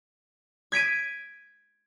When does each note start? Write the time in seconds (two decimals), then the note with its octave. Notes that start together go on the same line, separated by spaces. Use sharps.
0.72 G#6 B6 D7 D#7